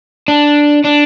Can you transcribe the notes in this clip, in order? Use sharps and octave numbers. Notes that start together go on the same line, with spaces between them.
D4
D4